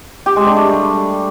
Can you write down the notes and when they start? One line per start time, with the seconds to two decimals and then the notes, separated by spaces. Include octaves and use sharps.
0.26 G4
0.36 G#3
0.46 D4
0.57 A3
0.67 G3